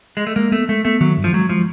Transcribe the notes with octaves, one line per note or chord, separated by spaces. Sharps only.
G#3
A3
G#3 A#3
A3 B3
G#3 A3
A3 B3
D#3 F#3
G2
F3
F#3 G#3
F3 G#3